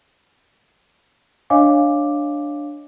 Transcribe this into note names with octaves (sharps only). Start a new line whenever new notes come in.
D4 C#5 D#5 F5 G#5 D6